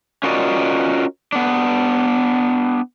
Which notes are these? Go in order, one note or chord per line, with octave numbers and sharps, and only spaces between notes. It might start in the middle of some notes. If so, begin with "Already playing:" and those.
C#4 F4 F#4 A#4 D5 D#5
B3 D4